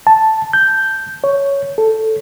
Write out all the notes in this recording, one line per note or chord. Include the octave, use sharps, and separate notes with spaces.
A5
G6
C#5
A4